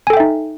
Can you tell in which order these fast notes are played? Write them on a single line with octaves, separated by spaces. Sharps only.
G#5 A4 G5 E5 D#4